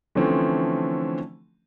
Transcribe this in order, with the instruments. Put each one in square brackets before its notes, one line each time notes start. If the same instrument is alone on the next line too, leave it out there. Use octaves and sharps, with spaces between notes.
[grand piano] D3 E3 F3 A3 C4 C#4